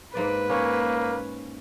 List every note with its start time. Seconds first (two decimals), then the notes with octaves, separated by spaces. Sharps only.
0.15 G#2 A#3 B4 D5
0.49 A#3 C#4 C#5